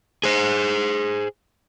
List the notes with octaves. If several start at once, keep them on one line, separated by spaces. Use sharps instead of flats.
G#4 C5